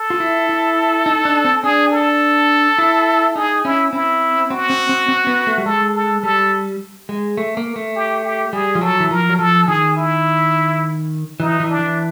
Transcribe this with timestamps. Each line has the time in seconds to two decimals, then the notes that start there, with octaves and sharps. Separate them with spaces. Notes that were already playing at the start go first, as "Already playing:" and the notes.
Already playing: A4
0.10 F4
0.20 E4
0.49 E4
1.06 D#4
1.25 D4
1.45 C4
1.63 D4 G#4
1.92 A4
2.78 E4
3.36 D#4 G#4
3.65 C#4 E4
3.93 C4 E4
4.50 C4 F#4
4.70 C4
4.89 C4
5.08 C4
5.27 B3
5.47 A3
5.58 G3
5.66 G#3 A4
5.94 A4
6.23 G3 A4
7.09 G#3
7.37 A3
7.57 A#3
7.76 A3
7.95 G4
8.24 G4
8.53 G3 G#4
8.75 F3
8.81 F#3 A4
9.00 E3
9.11 F3 A#4
9.29 F#3
9.39 F3 A4
9.68 D#3 G#4
9.97 E4
11.40 E3 D#4
11.60 E3
11.69 D4
11.79 E3